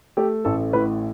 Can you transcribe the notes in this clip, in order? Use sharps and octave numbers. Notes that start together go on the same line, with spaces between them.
A3 G4
A1 A4
A2 B4